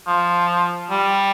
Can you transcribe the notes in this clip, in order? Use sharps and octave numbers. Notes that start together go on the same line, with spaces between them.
F3
G3